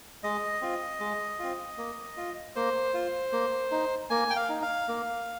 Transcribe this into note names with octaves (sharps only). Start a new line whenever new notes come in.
G#3 D#5
C4 F4
G#3
C4 F4
A#3
F4
A#3 C5
F4
A#3
D#4
A#3 G#5
G5
F5
D#4
F5
A#3